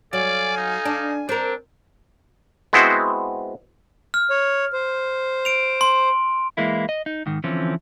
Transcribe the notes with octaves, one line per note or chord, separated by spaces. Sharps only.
F#3 A4 D5 F5 G#5
D#4
D4
C4 D4 A#4
G#3 B3 C4 E4 F#4 C5
F6
C#5
C5
D7 F7
C6
E3 G#3 A#3 E4
D#5
D#4
G#2 D#3
D3 E3 F3 C4 C#4